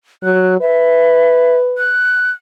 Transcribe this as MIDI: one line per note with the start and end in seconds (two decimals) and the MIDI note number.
0.23 0.58 54
0.23 0.55 90
0.61 1.92 71
0.61 1.57 76
1.78 2.31 90